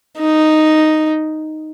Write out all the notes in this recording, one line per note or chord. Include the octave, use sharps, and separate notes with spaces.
D#4